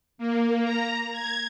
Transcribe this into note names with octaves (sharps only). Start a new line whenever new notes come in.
A#3
A#5
G#6